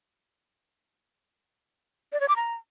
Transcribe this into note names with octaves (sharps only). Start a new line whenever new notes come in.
D5
C#5
D6
A#5